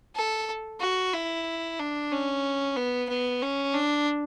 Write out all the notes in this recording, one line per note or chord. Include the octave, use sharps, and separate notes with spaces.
A4
F#4
E4
D4
C#4
B3
B3
C#4
D4